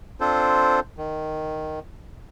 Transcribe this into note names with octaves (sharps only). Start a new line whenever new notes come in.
C4 D4 F4 A4 C5
D#3